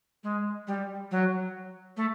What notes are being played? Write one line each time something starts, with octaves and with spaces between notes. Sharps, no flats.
G#3
G3
F#3
A3